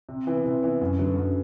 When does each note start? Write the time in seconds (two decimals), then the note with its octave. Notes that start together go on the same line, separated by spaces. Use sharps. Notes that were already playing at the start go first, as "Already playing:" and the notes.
0.09 C3
0.27 E3 B3
0.45 C3
0.63 E3 B3
0.81 F#2
0.99 D3 F#3 B3
1.17 F#2